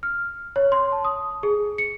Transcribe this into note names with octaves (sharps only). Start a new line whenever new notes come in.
F6
C#5
C6
A5
D#6
G#4
C#7